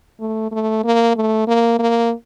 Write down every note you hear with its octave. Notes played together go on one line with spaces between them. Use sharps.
A3
A3
A#3
A3
A#3
A#3